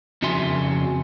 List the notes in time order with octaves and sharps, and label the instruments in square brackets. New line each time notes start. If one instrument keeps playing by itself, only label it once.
[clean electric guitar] F2 C#3 F#4 E5 G#5 C6